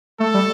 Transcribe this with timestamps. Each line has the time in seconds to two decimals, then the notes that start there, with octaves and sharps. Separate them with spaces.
0.20 A3 A4
0.34 G3